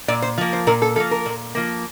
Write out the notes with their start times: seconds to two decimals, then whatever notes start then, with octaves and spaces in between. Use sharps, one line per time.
0.08 A#2 D5
0.22 C5
0.38 F3 A#3
0.53 C5
0.67 A#2 A#4
0.82 A4
0.96 F3 A#3 A4
1.11 A#4
1.26 A#2
1.55 F3 A#3